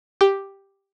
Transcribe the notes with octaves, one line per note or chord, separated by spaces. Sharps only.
G4